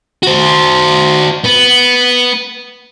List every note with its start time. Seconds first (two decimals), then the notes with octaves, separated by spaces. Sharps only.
0.23 F#4 C5
1.45 B3